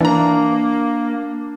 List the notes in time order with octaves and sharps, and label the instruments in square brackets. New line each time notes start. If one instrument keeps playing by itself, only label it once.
[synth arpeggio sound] E3 A#5 [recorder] A#3 [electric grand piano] D4